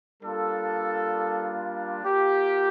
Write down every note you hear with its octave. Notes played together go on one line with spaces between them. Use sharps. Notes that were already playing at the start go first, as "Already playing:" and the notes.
G3 A#3 D4 F4 A4
A#3 F4 G4